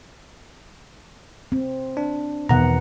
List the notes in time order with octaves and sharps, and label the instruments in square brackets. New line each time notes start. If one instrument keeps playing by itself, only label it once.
[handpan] C4
[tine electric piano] D4
[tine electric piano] E2 D#3 A#5 [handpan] B2 B3 F#5